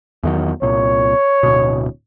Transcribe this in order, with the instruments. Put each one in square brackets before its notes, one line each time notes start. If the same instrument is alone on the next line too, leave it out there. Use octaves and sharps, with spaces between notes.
[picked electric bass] E2 D#3 F#3
[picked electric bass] C2 A#2 [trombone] C#5
[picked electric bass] D1 B2